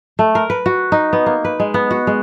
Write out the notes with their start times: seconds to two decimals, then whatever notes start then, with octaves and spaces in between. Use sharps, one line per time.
0.19 A3
0.35 A#4
0.50 B4
0.66 F#4
0.92 D#4
1.13 B3
1.26 A#3
1.45 B4
1.60 G#3
1.74 B3
1.91 F#4
2.07 G#3